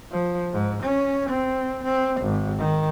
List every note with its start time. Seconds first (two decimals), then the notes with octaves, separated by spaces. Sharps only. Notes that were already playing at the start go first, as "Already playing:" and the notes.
0.12 F3
0.53 G#2
0.83 C#4
1.30 C4
1.84 C4
2.21 G#1
2.59 D#3